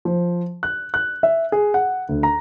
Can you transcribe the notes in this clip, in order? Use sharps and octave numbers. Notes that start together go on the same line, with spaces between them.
F3
F#6
F#6
E5
G#4
F#5
D2
A#5